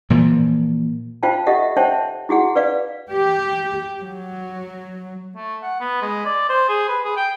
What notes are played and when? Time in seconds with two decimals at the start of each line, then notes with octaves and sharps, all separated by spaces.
0.10 A#2 E3 F3
1.23 F4 C5 F5 G5 A5
1.47 F4 G4 A4 D#5 E5 F#5
1.77 C5 C#5 E5 F#5 G5 A5
2.29 E4 F#4 G#4 F#5
2.56 B4 D5 F5
3.10 G4
4.02 F#3
5.36 A3
5.63 F#5
5.81 B3
6.02 G#3
6.26 D5
6.49 C5
6.69 G#4
6.89 B4
7.04 G#4
7.17 G5